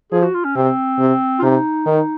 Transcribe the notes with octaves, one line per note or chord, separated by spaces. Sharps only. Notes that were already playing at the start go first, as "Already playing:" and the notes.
F3 G#4
F#4
F4
C#4
C3 C4
C3
F4
C3 D#4
D#3